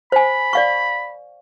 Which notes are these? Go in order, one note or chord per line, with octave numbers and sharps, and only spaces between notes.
C5 G#5 B5
D5 F5 C#6